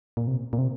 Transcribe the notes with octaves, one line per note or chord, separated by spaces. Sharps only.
A#2
C3
A#2
C3